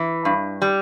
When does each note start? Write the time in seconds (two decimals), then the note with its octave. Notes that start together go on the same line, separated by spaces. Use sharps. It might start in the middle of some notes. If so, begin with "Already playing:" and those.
Already playing: E3
0.25 G2
0.62 G3